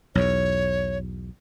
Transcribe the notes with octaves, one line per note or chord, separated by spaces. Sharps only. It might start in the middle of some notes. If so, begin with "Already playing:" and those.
B1 E2 C#5